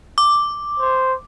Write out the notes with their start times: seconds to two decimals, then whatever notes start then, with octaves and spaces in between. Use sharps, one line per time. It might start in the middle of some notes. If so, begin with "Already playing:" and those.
0.18 D6
0.80 C5